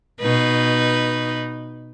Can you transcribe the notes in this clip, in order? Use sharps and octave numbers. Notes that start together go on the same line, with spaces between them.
B2 D#4 B4